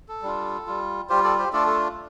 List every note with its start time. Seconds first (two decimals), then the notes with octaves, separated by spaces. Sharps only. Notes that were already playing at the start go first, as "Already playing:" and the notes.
0.08 A4
0.22 G3 D4 F4
0.67 G3 F4
1.09 G3 F4 G4 C5
1.24 A4 D5
1.38 G4 C5
1.53 A3 D4 F4 A4 D5
1.67 A4